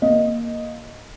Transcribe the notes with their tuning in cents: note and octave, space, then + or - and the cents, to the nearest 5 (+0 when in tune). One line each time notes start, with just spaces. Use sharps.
A#3 +0 D#5 +0